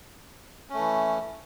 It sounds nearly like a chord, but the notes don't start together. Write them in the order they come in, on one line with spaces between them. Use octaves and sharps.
C#4 A3 E3